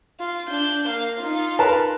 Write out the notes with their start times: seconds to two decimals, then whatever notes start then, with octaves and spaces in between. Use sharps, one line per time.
0.19 F4
0.49 D4 G6
0.87 A#3 F5
1.19 D#4 F4
1.59 A#4 B4 A5